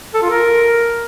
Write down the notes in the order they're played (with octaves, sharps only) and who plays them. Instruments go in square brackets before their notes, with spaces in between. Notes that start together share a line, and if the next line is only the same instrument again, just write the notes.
[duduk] A4
F4
A#4